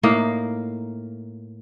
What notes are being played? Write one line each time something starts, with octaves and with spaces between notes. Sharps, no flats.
A2 A#3 D#4 F5